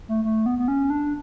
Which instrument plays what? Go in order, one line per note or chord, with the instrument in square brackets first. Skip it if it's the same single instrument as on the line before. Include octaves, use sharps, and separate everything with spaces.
[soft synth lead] A3
A3
B3
B3
C#4
D4